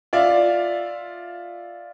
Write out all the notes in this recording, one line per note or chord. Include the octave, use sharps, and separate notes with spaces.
F4 D5 E5 F5